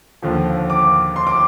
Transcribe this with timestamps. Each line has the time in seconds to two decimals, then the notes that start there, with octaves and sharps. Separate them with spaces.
0.22 D#2 D3 F3
0.70 D6
1.16 C6
1.27 D6